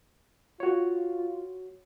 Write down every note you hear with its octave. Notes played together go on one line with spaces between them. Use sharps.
F4 F#4 C#5